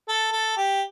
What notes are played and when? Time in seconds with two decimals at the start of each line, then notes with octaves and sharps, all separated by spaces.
0.09 A4
0.32 A4
0.57 G4